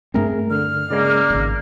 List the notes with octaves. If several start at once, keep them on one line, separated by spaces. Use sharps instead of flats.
G2 A3 C4 G#4 A#4
D3 F6
C#3 G#3 A#3 D5
D1 G#1